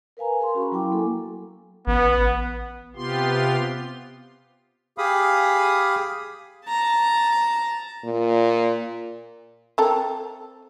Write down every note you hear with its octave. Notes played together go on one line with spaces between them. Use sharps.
A#4 B4 F5 G#5 A#5
G#4 A#4 F5 A#5 C6
C#4 F#4 B5 C#6
F#3 E4 G5 D6
A#3 A4 G#5
A1 B3
C3 B3 F4 G4 C6
G4 G#4 F5 B5 D#6
A5 A#5
A#2
C4 A4 A#4